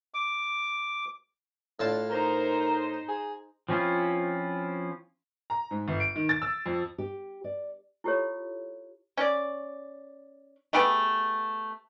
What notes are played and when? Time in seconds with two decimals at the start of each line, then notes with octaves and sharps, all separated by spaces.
0.14 D6
1.80 A2 D4 F4 A5
2.09 D#4 A#4 C5 A#5
3.09 G#4
3.69 F3 C4 C#4 E4 F4
5.50 A#5
5.71 G#2
5.88 G1
6.00 D7
6.16 D#3
6.29 A6
6.42 E6
6.66 F2
6.98 G4
7.44 D5
8.04 E4 F4 G4 A4 C#5
9.17 C#4 D5
10.73 A3 B3 G4 G#4